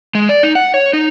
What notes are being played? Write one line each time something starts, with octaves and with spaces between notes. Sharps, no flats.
G#3
D5
D#4
F#5
C#5
D#4